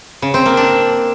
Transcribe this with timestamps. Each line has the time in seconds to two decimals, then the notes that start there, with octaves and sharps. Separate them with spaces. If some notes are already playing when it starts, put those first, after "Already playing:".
0.22 C#3
0.34 C4
0.46 A#3
0.57 D4